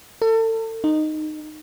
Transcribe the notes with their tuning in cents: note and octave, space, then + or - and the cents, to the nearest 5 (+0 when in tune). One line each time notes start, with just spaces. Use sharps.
A4 +35
D#4 -15